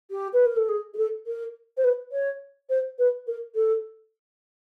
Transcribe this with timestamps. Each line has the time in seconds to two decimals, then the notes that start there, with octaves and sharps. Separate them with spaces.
0.11 G4
0.33 B4
0.45 A#4
0.56 A4
0.69 G#4
0.94 G#4
0.97 A4
1.26 A#4
1.77 C5
1.84 B4
2.12 C#5
2.69 C5
2.99 B4
3.27 A#4
3.55 A4